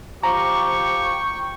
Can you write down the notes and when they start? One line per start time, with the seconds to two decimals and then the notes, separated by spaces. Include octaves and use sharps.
0.23 F3 G4 G5 A#5 C#6